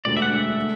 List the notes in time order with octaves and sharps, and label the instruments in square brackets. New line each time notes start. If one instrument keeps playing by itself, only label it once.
[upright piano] E1 D2 D3 [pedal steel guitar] D5
[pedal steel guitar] E5
F#5
E5
[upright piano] D3 A3